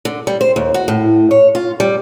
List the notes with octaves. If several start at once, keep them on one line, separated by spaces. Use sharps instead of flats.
D3
G3
C5
D#2
F#4
A2
C#5
F4
G3